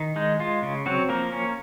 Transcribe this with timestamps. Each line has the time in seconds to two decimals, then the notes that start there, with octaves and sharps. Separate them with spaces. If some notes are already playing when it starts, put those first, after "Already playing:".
Already playing: D#3
0.16 G#3 D#4
0.39 G#3 F4
0.63 C#3
0.86 F#3 C4 F#4
1.09 F3 A#3 A#4
1.32 C#4